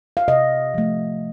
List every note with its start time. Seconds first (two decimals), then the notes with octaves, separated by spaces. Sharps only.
0.17 F5
0.28 C3 D#5
0.74 F3 A3